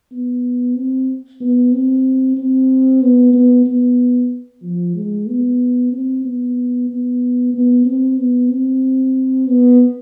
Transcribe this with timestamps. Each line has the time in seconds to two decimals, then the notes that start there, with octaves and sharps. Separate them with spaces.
0.12 B3
0.76 C4
1.40 B3
1.72 C4
2.37 C4
3.02 B3
3.33 B3
3.66 B3
4.63 F3
4.95 G#3
5.28 B3
5.92 C4
6.25 B3
6.89 B3
7.54 B3
7.85 C4
8.18 B3
8.51 C4
9.47 B3